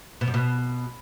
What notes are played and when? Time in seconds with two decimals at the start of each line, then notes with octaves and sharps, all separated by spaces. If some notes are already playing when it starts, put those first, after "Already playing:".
0.21 B2
0.28 F#2
0.34 B2